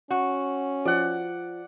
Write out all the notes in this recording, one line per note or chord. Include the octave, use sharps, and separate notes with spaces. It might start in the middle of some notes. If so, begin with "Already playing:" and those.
C#4 F#4
F3 D5 F#5